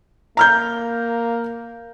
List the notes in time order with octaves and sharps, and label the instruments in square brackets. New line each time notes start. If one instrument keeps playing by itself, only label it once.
[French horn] A#3 [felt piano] A#5 F6 G6